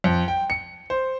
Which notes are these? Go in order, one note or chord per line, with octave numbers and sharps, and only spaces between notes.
F2
G5
C#7
C5